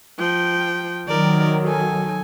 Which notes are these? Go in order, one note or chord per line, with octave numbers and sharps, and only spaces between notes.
F3 G5
D#3 F#3 A#4 D5
A4 G#5